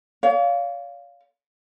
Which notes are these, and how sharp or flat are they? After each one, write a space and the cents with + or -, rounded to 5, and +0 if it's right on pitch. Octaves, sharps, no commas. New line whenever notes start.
C#5 +45 F5 +0